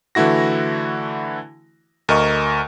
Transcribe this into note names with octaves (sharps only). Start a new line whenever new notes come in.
D3 E3 A3 E4 F#4 A#6
D2 A#4 D#5 C#6